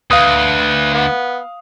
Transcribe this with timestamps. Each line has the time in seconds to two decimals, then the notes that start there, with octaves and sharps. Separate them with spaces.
0.11 D2 B4 F5 D#6
0.94 B3